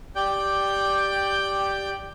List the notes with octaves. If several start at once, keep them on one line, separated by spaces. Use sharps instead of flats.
G4 D5 G5 G6